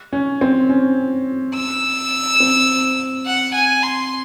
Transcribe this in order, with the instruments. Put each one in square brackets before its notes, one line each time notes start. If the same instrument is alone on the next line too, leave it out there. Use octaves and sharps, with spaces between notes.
[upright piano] C#4
C4
C#4
[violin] E6
[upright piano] C4
[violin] F#5
G#5
C6